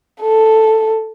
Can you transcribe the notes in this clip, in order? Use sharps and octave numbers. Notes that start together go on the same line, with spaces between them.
A4